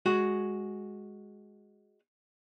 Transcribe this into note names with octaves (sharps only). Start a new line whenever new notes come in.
G#3 F#4 G#4